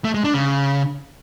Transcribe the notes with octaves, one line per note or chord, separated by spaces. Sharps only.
A3
G#3
D4
C#3